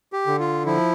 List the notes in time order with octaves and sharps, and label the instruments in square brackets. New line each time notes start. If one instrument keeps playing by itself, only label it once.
[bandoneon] G4
D3
F4
F3 E4